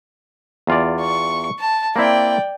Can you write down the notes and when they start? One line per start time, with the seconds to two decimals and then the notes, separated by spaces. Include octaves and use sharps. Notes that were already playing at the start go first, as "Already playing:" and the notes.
0.67 E2 F4 D5
1.01 C#6
1.59 A5
1.96 A#3 C4 E4 D5 G5